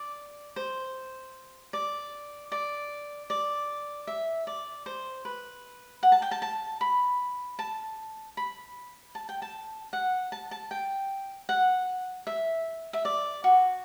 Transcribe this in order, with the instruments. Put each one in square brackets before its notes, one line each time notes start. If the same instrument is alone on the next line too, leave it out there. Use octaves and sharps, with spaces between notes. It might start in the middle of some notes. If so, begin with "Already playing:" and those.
Already playing: [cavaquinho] D5
C5
D5
D5
D5
E5
D5
C5
B4
F#5
A5
G5
A5
A5
B5
A5
B5
A5
G5
A5
F#5
A5
A5
G5
F#5
E5
E5
D5
F#4